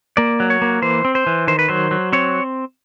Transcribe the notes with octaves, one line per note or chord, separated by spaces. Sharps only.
A#3 D5
F#3
C#5
A#3
E3 C5
C4
C5
E3
D#3 C5
B4
F#3 C5
F#3
C4 C#5